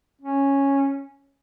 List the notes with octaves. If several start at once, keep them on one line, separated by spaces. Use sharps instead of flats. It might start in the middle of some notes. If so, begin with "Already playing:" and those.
C#4